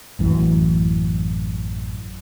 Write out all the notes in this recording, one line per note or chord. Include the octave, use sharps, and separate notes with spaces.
A1 F#2 E3